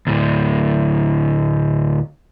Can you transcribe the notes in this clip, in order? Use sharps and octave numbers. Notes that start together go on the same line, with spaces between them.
D2 A2